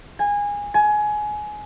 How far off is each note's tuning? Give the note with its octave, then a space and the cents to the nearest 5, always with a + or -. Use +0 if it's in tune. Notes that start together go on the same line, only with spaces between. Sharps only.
G#5 -20
G#5 +20